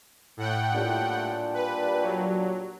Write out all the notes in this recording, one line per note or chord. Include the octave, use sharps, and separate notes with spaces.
A2 F#5 G5
A#2 G3 D4
B4
F#3